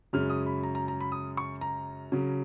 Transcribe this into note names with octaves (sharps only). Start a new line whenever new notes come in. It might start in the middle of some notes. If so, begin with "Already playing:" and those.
F#2 C#3 G#3 C#4 F6
D#6
B5
A#5
A#5
A#5
B5
D#6
C#6
A#5
C#3 F#3 C#4